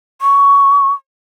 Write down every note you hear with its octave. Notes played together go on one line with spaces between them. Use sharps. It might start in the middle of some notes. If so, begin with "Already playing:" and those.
C#6